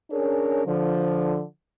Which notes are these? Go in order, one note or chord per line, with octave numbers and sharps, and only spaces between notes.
C#4 D4 G#4 A#4 C#5
D3 F3